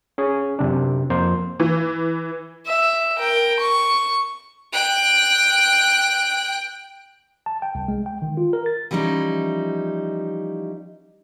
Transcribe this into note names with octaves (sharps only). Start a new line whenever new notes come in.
C#4 G#4
F#2 C3 D4
F2 A#3 C5
E3
E5
A#4 G5
C#6
G5 F#6
A5
G5
C2
G#3
G5
D#3
F4
A#4
A6
E3 F3 G3 C#4 D#4 E4